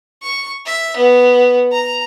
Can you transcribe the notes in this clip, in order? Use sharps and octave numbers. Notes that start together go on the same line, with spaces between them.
C#6
E5
B3
A#5